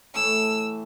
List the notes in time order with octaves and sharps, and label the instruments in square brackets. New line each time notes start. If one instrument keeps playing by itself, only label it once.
[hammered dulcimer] A2 E3 A3 [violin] E6